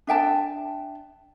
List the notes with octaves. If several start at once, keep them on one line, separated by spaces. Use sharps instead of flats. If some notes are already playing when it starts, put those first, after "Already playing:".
D4 E5 G5 A5